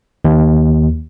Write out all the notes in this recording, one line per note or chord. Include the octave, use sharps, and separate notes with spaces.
D#2